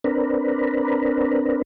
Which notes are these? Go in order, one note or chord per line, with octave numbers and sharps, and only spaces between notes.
C4 D4 A#4 B4